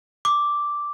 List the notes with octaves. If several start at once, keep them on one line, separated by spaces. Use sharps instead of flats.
D6